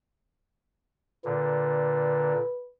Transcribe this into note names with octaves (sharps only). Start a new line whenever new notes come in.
A#2 D3 B4